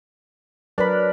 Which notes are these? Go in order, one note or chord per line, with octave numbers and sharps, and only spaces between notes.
F#3 D4 A#4 B4 B5